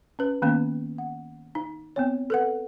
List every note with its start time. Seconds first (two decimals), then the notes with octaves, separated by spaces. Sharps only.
0.19 C#4 B4
0.42 D#3 A#3 B3 C#4
0.98 F#5
1.55 D#4
1.96 B3 C4 C#5
2.30 A4 B4 F#5